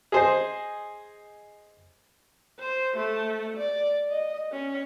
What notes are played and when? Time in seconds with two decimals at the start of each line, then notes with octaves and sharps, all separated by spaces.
0.12 G#4 C5 D#5
2.59 C5
2.96 A3
3.57 D5
4.10 D#5
4.52 C#4